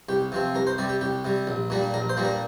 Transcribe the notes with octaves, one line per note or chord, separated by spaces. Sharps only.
C2 G4
C3 F3 C4
C2 A#4
C5
C3 G3 D5
G4
C2 G4
C3 G3
A#1
A#2 G3 A#3 D4
A#1 A#4
C5
A#2 G3 A#3 D4
A#4